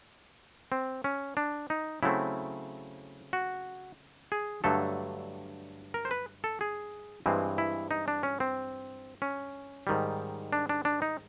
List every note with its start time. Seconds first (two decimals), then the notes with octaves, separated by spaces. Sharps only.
0.72 C4
1.04 C#4
1.37 D4
1.70 D#4
2.03 C#3 F#3 A3 C4 E4
3.33 F#4
4.32 G#4
4.64 G2 D3 F#3 A3 A4
5.94 A#4
6.05 C5
6.11 B4
6.44 A4
6.61 G#4
7.26 G2 E3 G#3 C4
7.58 E4
7.91 D#4
8.08 D4
8.23 C#4
8.40 C4
9.22 C#4
9.87 G#2 D#3 G3
10.53 D4
10.69 D4
10.85 D4
11.02 D#4